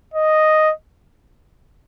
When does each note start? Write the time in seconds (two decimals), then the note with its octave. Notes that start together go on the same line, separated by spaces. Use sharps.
0.14 D#5